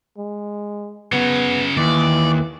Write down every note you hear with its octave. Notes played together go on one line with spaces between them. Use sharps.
G#3
C#3 F#3 B3
D#2 E3 D5